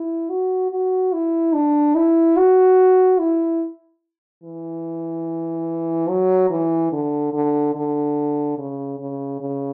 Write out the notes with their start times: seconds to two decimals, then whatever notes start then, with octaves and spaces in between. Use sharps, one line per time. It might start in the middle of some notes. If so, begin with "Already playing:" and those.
Already playing: E4
0.29 F#4
0.71 F#4
1.13 E4
1.53 D4
1.95 E4
2.37 F#4
3.19 E4
4.43 E3
6.09 F#3
6.50 E3
6.92 D3
7.33 D3
7.75 D3
8.58 C#3
8.99 C#3
9.41 C#3